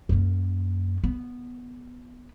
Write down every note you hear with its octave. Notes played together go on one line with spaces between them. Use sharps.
F#2 A#3
B3